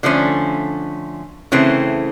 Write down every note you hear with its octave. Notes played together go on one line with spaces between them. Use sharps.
D3 F3 A3 C#4
C#3 E3 A3 C4